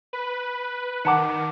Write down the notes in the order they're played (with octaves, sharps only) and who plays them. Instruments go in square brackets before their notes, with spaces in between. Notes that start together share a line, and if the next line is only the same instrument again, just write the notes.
[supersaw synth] B4
[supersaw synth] D#3 [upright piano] F#5 A5 D6